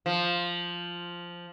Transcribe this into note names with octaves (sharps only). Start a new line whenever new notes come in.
F3